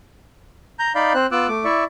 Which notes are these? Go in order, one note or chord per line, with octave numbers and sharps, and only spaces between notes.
A#5 G6
D#4 D5 F5 B5 G6
C4 C5 F#6
B3 F4 D6 E6 F#6
A3 D6
E4 D5 E5 C#6